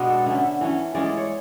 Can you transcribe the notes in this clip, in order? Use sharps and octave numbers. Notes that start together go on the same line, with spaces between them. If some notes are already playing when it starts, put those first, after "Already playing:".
Already playing: B2 G#3 B3 D4
A4
D3 A3 C#4 E5
E5
E3 A3 C#4
E3 G#3 C#4 D5
D5
C#5